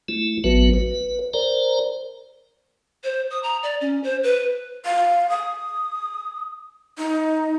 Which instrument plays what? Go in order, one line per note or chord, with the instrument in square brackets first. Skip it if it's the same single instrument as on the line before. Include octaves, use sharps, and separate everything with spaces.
[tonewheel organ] A3 E4
A1 F#3 B3 F#4 B4
B4
A#4 C5 D5 A#5
[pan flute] C5
D#6
A#5
D5
C#4
C5
B4
[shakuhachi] F5
D#6
D#4